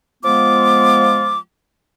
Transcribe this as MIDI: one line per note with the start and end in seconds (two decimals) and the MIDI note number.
0.24 1.38 53
0.24 1.38 56
0.24 1.38 59
0.24 1.38 65
0.24 1.38 86